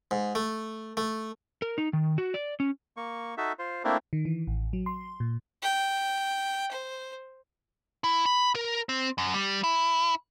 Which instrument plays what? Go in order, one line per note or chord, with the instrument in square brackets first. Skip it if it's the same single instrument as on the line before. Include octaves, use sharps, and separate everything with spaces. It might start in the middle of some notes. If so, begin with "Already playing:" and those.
[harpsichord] G#2
A3
A3
[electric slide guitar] A#4
D#4
D#3
F#4
D5
C#4
[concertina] A#3 C#6
D#4 F#4 A4 E5
F4 C5
A3 A#3 C4 D4 E4
[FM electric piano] D#3
E3
A1
F#3
C6
A#2
[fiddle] G5
C5
[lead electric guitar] E4
B5
A#4
C4
F#2
G3
E4